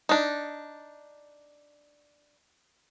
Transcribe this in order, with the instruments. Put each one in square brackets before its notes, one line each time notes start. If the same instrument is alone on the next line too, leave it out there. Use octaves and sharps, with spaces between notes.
[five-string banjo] D4 D#4